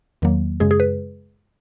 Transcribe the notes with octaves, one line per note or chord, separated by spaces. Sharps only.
E2 D#3 F#3 A#3
F#2 C#3 G#3 G#4
G#4
B4